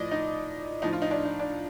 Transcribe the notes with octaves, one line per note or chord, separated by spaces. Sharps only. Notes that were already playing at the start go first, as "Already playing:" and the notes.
Already playing: A2 F3 D5 D#5
D#4
A2 F3 D#4
F4
D#4
D4
D#4
D4